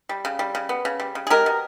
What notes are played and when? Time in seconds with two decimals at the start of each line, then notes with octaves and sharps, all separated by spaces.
0.09 G3
0.25 C#3
0.39 G3
0.55 C#3
0.69 B3
0.85 C#3
1.00 G3
1.15 C#3
1.27 G#4
1.30 G#3 G4 A#4
1.46 B2